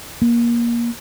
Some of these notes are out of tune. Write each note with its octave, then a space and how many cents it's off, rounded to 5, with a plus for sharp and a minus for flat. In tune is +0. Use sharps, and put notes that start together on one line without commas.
A#3 +20